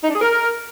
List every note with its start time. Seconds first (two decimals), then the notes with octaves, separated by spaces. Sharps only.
0.03 D#4
0.09 D4
0.15 G#4
0.21 A#4